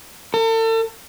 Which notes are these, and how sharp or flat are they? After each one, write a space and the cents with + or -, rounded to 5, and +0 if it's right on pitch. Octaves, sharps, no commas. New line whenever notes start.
A4 +40